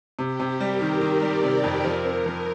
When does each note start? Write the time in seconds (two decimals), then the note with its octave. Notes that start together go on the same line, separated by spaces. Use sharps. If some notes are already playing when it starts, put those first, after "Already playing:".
0.19 C3 G4
0.40 C3
0.60 G3 A#4
0.81 D#3
1.01 D#3 D5
1.22 G3
1.43 C3
1.64 F2
1.84 F3 A#4
2.05 C4
2.26 F3